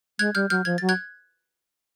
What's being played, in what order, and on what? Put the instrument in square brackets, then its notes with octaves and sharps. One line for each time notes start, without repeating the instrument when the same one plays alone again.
[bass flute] G#3 [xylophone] F#6 G#6
[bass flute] G3 [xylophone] F6 G6
[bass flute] F#3 [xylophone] F6 G6
[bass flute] F3 [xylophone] G#6
[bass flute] F#3 [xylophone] A6
[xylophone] F#6 G#6